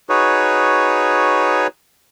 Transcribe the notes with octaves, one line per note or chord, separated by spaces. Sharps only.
D#4 F#4 G#4 B4 C#5